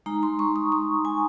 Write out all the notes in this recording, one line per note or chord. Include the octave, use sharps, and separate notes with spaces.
G#3 D#4 A#5
C6
C#6
D#6
C#6
G#5